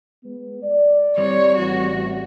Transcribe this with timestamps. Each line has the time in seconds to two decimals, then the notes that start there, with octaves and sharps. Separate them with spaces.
0.23 G#3 B3
0.62 D5
1.18 G3 C4 C#5
1.56 A1 F#4